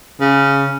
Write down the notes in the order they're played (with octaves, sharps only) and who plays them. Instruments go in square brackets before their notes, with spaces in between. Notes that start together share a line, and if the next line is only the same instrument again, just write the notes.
[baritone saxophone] C#3